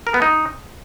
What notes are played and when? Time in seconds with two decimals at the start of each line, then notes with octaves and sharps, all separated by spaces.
0.07 A#4
0.14 B3
0.22 D#4